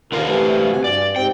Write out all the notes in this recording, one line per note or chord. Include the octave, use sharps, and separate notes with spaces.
D#2 D3 F4 A#4 B4 F5
C3 E3 A3
C3 F#4 G#5
G2 D5
G#2 C3 C4 G5